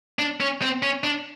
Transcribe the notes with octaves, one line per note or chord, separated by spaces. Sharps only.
D4
C#4
C4
C#4
D4